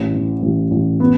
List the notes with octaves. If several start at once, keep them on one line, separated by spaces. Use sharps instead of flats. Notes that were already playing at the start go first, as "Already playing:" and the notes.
Already playing: A1
E3
A1
A1
B3